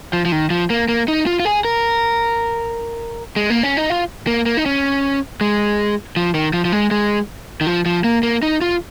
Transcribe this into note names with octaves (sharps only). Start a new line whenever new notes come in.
F3
F3
D#3
F3
A#3
A#3
D#4
F4
F4
G#4
A#4
G#3
A#3
C#4
D#4
F4
A#3
A#3
D#4
C#4
G#3
F3
D#3
F3
F3
G#3
G#3
D#3
F3
F3
A#3
A#3
D#4
F4